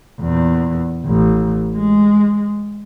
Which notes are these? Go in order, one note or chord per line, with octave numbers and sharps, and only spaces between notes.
E2 A#2
A1
G#3